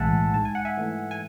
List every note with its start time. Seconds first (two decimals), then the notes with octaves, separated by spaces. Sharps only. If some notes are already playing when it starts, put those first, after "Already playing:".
Already playing: B1 A2 E3 G#3 E5 F#5 G#5 A5
0.34 G#2 A5
0.45 G#5
0.55 F#5
0.65 E5 G#5
0.77 E3 A3
1.11 G#5